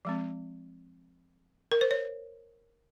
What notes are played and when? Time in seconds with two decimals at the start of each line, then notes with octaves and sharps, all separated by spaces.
0.05 F3 G#3 C4
1.72 A#4
1.81 C5
1.91 C#5